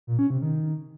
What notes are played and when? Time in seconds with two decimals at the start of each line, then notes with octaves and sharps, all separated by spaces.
0.07 A#2
0.19 C#4
0.30 C3
0.42 D#3